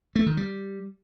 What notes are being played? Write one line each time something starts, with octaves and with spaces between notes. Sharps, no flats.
A3
D#3
G3